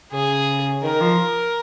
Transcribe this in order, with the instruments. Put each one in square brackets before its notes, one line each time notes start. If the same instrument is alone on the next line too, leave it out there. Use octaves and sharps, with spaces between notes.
[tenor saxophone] C#3 [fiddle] G#4
[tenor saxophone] D#3 [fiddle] A#4
[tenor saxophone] F3